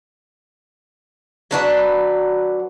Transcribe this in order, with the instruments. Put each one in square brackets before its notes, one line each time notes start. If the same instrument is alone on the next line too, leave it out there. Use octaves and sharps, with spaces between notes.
[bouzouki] F#3 D4 F#4 B4